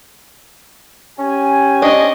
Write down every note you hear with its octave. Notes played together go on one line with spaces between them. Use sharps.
C#4 G4 G#5
C4 D4 D#5 C#6